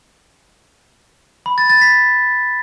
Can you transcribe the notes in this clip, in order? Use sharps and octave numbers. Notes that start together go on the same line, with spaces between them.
B5
A6
A6
B6